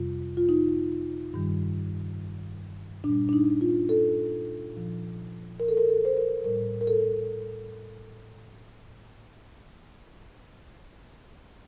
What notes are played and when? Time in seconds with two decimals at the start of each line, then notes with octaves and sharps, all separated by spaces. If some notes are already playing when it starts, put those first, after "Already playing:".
Already playing: F2 C3 G3 F4
0.37 F4
0.49 D#4
1.34 G2 D#3 G3
3.04 A#2 D4
3.09 G3
3.29 D4
3.33 D#4
3.61 F4
3.89 A4
4.74 A#2 F3
5.60 A#4
5.68 A4
5.77 A#4
5.88 A4
6.05 C5
6.17 A#4
6.44 A2 G3 A#4
6.81 A#4
6.87 A4